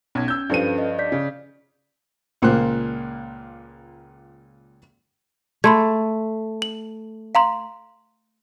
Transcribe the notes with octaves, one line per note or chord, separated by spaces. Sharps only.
B1 C#4 G#6
E6 G6
G2 F3 C#4 A4 B4 D#7
D#5
D5 G6 B6
C#3
C#2 A#2 A#3 C5 F#6
A3 B5 C6 G#6
F#7
F5 A#5 C6